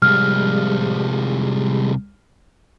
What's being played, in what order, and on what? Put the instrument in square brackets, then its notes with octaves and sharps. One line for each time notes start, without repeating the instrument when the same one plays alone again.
[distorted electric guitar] C2 F3 [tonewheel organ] G3 G#3 [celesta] F6